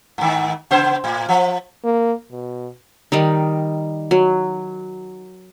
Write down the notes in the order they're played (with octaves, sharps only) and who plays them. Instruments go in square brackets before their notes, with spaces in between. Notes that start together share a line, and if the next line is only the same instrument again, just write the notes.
[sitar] G#2 D#3
C#3 B3 C5
A2
F3
[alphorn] A#3
B2
[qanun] D#3 G3 D#4
F#3